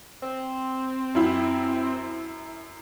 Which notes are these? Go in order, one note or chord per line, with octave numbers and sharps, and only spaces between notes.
C4
F#2 E4